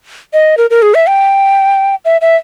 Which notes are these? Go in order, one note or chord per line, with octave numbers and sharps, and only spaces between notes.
D#5
A#4
A#4
G#4
E5
G5
E5
E5